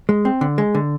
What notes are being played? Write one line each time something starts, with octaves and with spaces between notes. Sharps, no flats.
G#3
C4
D3
G#3
D3